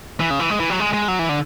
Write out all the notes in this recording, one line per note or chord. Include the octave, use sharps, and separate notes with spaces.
E3
C#3
E3
G#3
E3
F#3
G#3
G#3
F#3
E3
D3